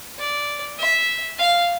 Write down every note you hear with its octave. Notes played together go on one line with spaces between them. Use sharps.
D5
E5
F5